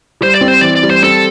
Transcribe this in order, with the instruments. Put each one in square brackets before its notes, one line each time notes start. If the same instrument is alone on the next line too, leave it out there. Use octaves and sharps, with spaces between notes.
[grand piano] G3 [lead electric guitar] C5
[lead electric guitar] D5
[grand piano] C4
[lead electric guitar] C5
[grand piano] E3 [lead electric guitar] D5
[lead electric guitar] D5
[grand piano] G3
[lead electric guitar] C5
[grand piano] C4 [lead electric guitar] A4